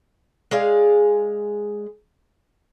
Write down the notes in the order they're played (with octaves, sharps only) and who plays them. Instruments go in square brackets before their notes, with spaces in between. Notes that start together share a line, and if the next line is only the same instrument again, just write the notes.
[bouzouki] G#3 G#4 D5 F5